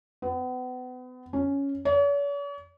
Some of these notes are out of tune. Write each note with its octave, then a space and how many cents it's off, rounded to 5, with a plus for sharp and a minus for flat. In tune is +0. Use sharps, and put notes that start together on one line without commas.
B3 +35
C#4 +5
C#5 +45